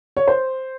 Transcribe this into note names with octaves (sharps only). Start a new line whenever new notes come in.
C#5
C5